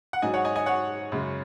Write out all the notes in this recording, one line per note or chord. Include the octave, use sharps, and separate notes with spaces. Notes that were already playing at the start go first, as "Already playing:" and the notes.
F#5
G#2 F#3 D#5 G#5
C#5 F#5
D#5 G#5
D#5 G#5
C#5 F#5
F#2 C#3 G#3